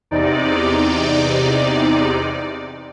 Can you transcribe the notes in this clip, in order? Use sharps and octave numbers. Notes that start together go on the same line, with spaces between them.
E2 C3 D#4 D5